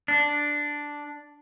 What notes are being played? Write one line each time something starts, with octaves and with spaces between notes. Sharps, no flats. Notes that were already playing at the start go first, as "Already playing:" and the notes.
D4